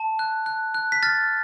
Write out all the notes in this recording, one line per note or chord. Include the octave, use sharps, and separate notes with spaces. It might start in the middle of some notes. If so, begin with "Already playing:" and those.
Already playing: A5
F#6
F#6
F#6
B6
F6 A6